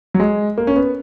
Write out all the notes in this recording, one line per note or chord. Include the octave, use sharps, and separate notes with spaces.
F#3
G#3
A#3
C#4
B3